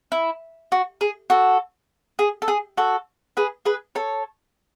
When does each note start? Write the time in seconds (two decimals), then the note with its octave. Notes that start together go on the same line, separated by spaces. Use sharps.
0.12 E4
0.72 F#4
1.01 G#4
1.30 F#4 A4
2.19 G#4
2.42 A4
2.48 G#4
2.77 F#4 A4
3.37 G#4 B4
3.65 G#4 B4
3.95 A4 C#5